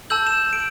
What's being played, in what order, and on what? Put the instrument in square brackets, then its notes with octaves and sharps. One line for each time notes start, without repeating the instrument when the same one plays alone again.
[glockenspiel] A5 E6 G6 F#7
E7
D7